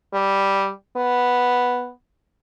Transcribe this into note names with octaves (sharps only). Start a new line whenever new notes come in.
G3
B3